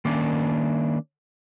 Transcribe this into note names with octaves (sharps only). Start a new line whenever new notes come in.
D#3 A#3 C#4 D4